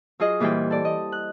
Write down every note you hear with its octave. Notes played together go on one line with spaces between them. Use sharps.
F#3 F4 G#4 D#5
A#2 E3 G3 C5 G5
A4 D5
D#5
F#6